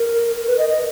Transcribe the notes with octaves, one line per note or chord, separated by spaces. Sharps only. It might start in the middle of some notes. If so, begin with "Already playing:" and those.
Already playing: A#4
A#4
B4
D#5
D#5